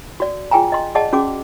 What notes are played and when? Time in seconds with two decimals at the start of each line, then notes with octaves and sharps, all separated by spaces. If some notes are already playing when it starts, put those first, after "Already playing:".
0.20 F#4 D5
0.51 F4 G#4 G5 G#5 A#5
0.72 D#5 C6
0.95 G#4 D5 D#5 F#5 A5
1.13 C#4 F#4 G#4 D6